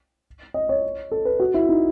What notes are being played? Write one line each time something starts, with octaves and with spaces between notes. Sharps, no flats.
D#5
C#5
A4
B4
F#4
E4
D#4